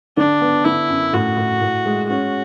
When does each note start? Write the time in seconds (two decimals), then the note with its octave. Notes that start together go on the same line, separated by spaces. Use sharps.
0.17 D3 D4
0.41 B3
0.65 D3 E4
0.89 F#2
1.13 A2 F#4
1.37 A2
1.61 A2
1.86 G#3
2.09 C#4 F#4